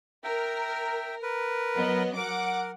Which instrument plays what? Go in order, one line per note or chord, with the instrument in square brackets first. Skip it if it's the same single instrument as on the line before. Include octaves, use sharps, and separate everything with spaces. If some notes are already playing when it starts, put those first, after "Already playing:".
[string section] A#4 [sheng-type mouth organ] E5 G5
[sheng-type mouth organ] A#4 B4
[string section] F#3 B3 D#5
[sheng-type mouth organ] A#4 [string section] F#5 D6